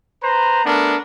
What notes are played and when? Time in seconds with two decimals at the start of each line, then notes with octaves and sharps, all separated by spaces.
0.23 B4 C5 A#5
0.65 A3 B3 D4 A#4